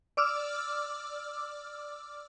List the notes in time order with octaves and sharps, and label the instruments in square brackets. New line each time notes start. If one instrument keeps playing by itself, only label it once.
[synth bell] D5 D6 E6 F6